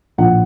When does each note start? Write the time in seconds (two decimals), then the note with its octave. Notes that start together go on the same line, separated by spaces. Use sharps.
0.18 A#1 A2 F3 F#5